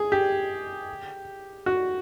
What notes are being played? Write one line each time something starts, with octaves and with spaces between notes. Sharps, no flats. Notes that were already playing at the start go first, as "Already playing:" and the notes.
Already playing: G#4
G4
F#4